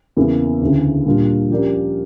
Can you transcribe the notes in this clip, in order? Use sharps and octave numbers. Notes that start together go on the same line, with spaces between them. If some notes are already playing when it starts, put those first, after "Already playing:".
E2 C#3 E3 A#3
D2 C#3 E3
A#2 G3 D4 F4
F3 C#4 G4 A#4 D5